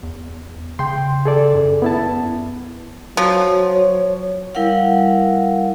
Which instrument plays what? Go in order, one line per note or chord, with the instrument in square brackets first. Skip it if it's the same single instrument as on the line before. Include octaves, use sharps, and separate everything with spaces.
[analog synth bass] E2
[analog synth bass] C#3 [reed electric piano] G5 C6
[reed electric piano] G#4 A4 D5
[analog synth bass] F#2
[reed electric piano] B3 E4 A5
[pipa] F3 [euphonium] F#3
[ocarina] C#5
[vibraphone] G3 E4 A#4 F5 F#5